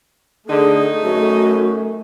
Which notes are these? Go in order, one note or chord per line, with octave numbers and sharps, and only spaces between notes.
D3 A3 D#4 G#4
F#2 F#4